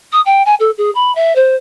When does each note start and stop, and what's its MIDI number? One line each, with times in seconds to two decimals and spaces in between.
0.12 0.20 87
0.25 0.42 79
0.45 0.55 80
0.59 0.71 69
0.77 0.90 68
0.95 1.13 83
1.15 1.34 76
1.35 1.55 72